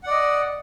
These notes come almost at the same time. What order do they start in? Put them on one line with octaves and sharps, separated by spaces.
F#5 D5 D#5